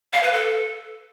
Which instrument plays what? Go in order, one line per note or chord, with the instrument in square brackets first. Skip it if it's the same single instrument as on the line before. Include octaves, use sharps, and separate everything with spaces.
[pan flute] F5
B4
A4